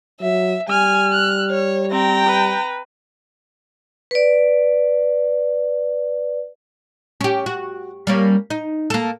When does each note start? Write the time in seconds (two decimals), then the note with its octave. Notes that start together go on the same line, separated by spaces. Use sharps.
0.21 F#3 E5
0.69 G3 G#5 F6
1.12 F#6
1.51 C#5
1.92 C4 G5 A#5
2.27 B4
4.11 B4 D5
7.21 C#4 G4
7.46 F#4
8.07 G3 A#3 C#4
8.50 D#4
8.90 A#3 A4